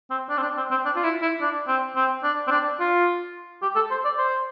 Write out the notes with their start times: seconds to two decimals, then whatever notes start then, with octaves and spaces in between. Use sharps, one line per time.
0.10 C4
0.29 D4
0.38 C4
0.43 D4
0.57 C4
0.71 C4
0.85 D4
0.96 F4
1.04 E4
1.22 E4
1.41 D4
1.68 C4
1.96 C4
2.23 D4
2.47 C4
2.51 D4
2.80 F4
3.62 G4
3.76 A4
3.91 C5
4.05 D5
4.18 C5